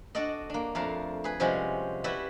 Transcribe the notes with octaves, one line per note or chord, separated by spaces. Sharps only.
D4 F#4 A4 D5 D#5
A#3 D4
F2 A3 D4 A#4 F5
G#4 B4
C3 F3 G3 G#3 C#4 F#4
G3 E4 F#4 B4 E5